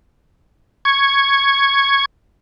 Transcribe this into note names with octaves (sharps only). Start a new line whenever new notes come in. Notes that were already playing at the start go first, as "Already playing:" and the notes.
C#6 G#6